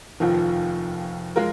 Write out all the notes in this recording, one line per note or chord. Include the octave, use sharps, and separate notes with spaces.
F1 D#2 D#3 F3
G#3 F4 A#4